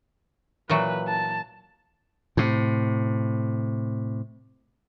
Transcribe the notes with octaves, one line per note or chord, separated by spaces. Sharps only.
A#2 E3 F#3 B4
A5
A2 C3